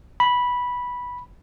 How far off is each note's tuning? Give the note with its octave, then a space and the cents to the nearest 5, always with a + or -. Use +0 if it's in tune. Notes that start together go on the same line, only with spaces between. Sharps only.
B5 -10